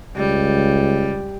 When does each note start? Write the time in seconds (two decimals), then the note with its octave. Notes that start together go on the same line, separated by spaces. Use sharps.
0.16 C#2 G3